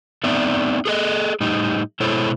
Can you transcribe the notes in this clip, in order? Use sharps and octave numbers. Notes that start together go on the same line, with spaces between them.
A3 B3 C4 D#4 D5 E5
G#4 A4 D#5
A2 G3 D#4
B2 G#3 E4 A4 C5 C#5